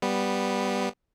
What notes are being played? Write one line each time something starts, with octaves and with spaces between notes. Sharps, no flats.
G3 B3